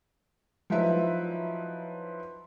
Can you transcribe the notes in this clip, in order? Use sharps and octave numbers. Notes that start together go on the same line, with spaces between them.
F3 F#3 D#4 E4 B4 E5